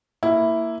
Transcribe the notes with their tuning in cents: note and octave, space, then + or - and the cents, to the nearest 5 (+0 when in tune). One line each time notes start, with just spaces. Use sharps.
A#3 -10 E4 +0